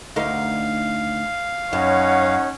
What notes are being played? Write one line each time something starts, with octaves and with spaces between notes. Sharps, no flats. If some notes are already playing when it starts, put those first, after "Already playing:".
D2 D#4 A#4 F5
F#2 C#4 D#4 C#5 F#5